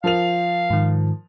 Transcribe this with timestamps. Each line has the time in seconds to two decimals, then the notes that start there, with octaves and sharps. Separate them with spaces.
0.04 F3 A#4 F5 F7
0.70 G#2 D#3